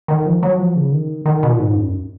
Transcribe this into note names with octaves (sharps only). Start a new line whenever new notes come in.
D#3
F3
F#3
F3
C#3
D#3
D#3
B2
A#2
G#2
F#2